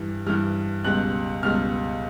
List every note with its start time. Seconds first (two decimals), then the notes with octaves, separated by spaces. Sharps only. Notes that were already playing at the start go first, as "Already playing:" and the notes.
Already playing: G2 E3 G3
0.26 G2 E3 G3 F6
0.84 C#2 B2 G3 F#6
1.43 C#2 B2 G3 F6